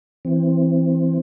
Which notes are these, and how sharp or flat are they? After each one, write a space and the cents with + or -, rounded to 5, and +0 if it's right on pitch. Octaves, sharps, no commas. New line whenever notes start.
E3 +10 C4 +0